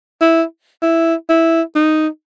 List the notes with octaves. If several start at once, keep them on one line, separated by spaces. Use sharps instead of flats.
E4
E4
E4
D#4